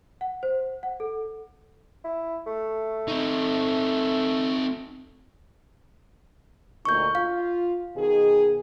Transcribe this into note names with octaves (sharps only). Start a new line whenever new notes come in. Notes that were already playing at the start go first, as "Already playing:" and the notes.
F#5
C5
F#5
A4
E4
A3
C4 D#4
D2 A#2 D#4 C#6 G6
F4 F5
B2 D#3 G#4